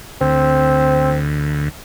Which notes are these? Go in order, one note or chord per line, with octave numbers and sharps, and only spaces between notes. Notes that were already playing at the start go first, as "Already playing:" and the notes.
D2 C4